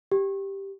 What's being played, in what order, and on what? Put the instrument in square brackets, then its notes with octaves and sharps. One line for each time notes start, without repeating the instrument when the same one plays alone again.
[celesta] G4